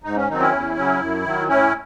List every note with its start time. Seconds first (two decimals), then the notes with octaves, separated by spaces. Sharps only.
0.04 G#2 D#4
0.16 C#4
0.28 D#3 F#3 C4 D#4
0.40 C#4 E4
0.52 E2
0.76 C#3 F#3 C#4
1.00 F#2
1.24 D#3 F#3
1.48 A2 C#4 E4